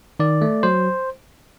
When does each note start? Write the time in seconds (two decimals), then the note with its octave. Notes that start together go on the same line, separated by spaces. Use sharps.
0.20 D#3 D5
0.42 A3
0.63 F#3 C5